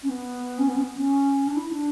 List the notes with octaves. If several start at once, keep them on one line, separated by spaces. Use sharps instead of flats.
C#4
B3
C#4
B3
C#4
B3
C#4
D4
E4
D4